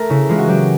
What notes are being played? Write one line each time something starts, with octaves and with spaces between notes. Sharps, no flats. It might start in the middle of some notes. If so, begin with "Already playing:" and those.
Already playing: A3 A#4
C#3 E4
E3 G#3 F4
F#4
F#3 G4